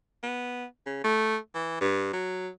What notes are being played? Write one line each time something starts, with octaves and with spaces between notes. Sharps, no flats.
B3
C#3
A3
E3
G2
F#3